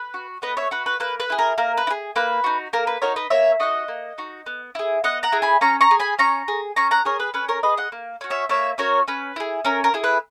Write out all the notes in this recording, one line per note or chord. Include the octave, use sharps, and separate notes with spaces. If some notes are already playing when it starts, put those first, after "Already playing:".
Already playing: B4
F#4
B3 B4 D#5
C#5 E5
F#4 B4
B4
A#3 B4
B4
E4 G#4
A#4
A#3 A#4
B4
E4
G#4
A#3 B4
D#4 F#4
A#3 A#4
B4
D#4 F#4 A#4 C#5
B4 D#5
A#3 C#5 E5
D#4 F#4 D#5 F#5
A#3
D#4 F#4
B3
E4 G#4
B3 D#5 F#5
F#5 A#5
E4 G#4
G#5 B5
C#4 A#5 C#6
A#5 C#6
G#4
G#5 B5
C#4 A#5 C#6
G#4
C#4 A#5 C#6
F#5 A#5
G#4 A#4 C#5
B4
C#4 B4
A#4 C#5
G#4 B4 D#5
D#5 F#5
A#3
C#4 F#4
C#5 E5
A#3 C#5 E5
C#4 F#4 A#4 C#5
C#4 B4
E4 G#4
C#4 A#4
A#4
E4 G#4
B4